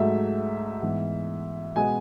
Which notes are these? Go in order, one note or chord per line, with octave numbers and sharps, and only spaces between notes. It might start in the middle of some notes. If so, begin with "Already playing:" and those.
Already playing: G#2 F#3 A3 E5
G#2 E3 B3
B2 G#3 B3 G#5